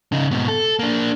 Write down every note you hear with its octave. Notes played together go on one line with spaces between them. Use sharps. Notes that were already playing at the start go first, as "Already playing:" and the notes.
C#3 D#4
G#2 B2
A4
A#3 D4